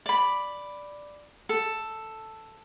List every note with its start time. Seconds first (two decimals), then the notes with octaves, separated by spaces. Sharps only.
0.06 D5 B5
1.49 A4